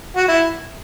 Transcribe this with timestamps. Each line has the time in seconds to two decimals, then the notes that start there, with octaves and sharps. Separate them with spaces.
0.16 F#4
0.28 E4